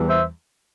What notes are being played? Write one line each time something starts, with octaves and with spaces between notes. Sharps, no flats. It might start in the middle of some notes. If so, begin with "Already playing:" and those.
Already playing: E2 E3 G3
C5 E5